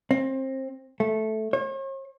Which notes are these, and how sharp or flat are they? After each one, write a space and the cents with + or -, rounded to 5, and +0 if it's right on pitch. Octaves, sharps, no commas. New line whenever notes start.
C4 +25
A3 -10
C#5 -45